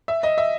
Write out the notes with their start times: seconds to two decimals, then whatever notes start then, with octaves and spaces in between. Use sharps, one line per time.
0.08 E5
0.23 D#5
0.38 E5